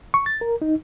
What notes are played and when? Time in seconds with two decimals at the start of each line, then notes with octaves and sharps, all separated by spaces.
0.14 C#6
0.26 A6
0.41 A#4
0.62 D#4